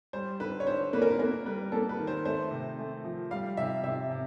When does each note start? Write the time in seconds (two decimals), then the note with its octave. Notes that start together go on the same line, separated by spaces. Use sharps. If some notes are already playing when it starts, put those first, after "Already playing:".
0.13 G3 C5
0.40 D3 B4
0.60 C#5
0.67 D3 C5
0.93 A#3 B4
1.02 A#4
1.09 B4
1.19 A#3 A#4
1.45 G3 B4
1.72 A#3 A4
1.89 B4
1.99 D#3
2.07 C5
2.25 A3 C5
2.51 C3
2.79 A3
3.04 F3
3.31 G3 F5
3.57 C3 E5
3.84 C3 E5
4.10 C3